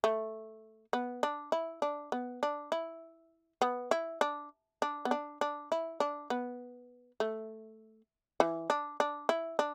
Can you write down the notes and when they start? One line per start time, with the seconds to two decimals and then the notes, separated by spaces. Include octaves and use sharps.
0.04 A3
0.93 B3
1.23 D4
1.52 E4
1.82 D4
2.12 B3
2.43 D4
2.72 E4
3.62 B3
3.91 E4
4.21 D4
4.82 D4
5.05 B3
5.11 D4
5.41 D4
5.72 E4
6.00 D4
6.30 B3
7.20 A3
8.40 E3
8.70 D4
9.00 D4
9.29 E4
9.59 D4